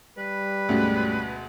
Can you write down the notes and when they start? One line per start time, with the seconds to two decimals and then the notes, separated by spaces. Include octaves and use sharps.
0.18 G3 B4
0.69 D2 G#2 B2 G#3 A3 C#4